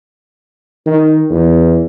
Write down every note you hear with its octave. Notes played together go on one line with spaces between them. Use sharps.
D#3
E2